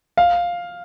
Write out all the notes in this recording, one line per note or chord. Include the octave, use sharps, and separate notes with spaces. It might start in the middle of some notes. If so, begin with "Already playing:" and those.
F5